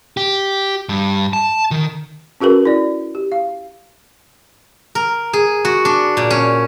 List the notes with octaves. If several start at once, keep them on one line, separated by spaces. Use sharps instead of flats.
G4
G2
A5
D#3
C#4 F#4 G#4 A#4 B4
E4 D5
G4
F5
A#4
G#4
F#4
D4
A#2
C#4